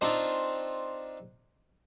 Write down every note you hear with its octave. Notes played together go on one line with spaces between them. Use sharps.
C4 D4 D#4 F4